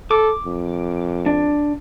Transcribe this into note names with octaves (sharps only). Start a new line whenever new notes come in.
A4 D6
F2
D4